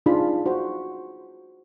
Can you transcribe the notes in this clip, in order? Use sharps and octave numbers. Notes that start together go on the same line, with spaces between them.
D4 D#4 F4 G#4 B5
F#4 C5